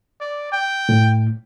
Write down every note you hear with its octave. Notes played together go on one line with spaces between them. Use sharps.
D5
G5
A2